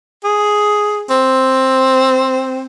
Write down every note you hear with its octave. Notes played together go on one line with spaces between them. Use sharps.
G#4
C4